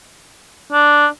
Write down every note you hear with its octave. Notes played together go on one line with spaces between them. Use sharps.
D4